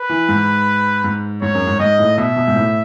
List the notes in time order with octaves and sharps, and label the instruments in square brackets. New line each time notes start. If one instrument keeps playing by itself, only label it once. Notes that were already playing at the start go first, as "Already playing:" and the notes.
Already playing: [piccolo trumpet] B4
[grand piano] E3
G#2
G#2
[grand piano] G#2 [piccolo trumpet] C#5
[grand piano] F#2
G#2
[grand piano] G#2 [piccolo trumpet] D#5
[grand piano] A2
[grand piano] B2 [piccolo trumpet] E5
[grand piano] B2
G#2
A2